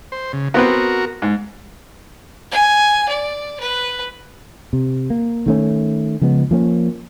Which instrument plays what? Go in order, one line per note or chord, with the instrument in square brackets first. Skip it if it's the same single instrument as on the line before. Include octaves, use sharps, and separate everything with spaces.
[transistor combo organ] C5
C#3
[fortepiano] B3 C4 B4 [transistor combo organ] F#4 A#4
[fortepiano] G#2
[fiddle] G#5
D5
B4
[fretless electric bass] C3
A#3
D#3 A3 C#4
C#3 F3 G#3 B3
F3 A#3 C#4